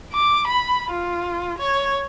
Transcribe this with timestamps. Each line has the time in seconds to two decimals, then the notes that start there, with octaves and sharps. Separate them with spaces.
0.13 D6
0.48 B5
0.91 F4
1.58 C#5